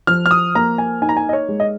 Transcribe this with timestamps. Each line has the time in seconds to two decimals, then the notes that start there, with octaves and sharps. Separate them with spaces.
0.07 F3 F6
0.26 F6
0.31 D#6
0.55 A#3 A#5
0.78 G#5
1.02 D#4 G#5
1.09 A#5
1.17 G#5
1.29 D#5
1.33 C#5
1.49 G#3
1.60 D#5